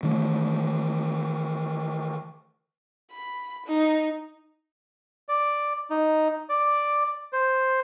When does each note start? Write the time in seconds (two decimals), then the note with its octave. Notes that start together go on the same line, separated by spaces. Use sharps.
0.03 D#3 E3 A3
3.11 B5
3.66 D#4
5.29 D5
5.90 D#4
6.49 D5
7.33 C5